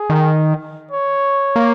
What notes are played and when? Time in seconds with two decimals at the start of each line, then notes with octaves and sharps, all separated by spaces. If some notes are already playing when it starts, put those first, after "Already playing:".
Already playing: G#4
0.10 D#3
0.91 C#5
1.56 A#3